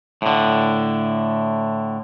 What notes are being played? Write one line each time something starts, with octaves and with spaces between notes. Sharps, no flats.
A2 D3